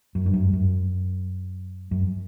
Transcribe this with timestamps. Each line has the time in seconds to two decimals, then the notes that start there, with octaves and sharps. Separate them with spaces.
0.15 F#2
0.26 G2
0.34 F#2
0.53 F#2
1.91 F#2